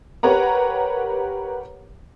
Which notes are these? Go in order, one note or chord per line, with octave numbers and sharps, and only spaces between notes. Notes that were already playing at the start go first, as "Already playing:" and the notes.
G4 A#4 B4 C#5 F#5 A#5